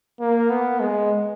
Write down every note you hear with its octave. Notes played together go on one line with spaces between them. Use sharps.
A#3
B3
G#3